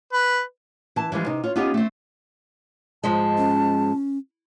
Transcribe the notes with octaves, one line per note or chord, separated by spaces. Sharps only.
B4
E3 A5
E3 F3 G3 G#3
C3 D#4
F4 C#5
B3 C#4 D#4 F4 G4 G#4
A3 C4
G#2 F3 G#3 A5
C#4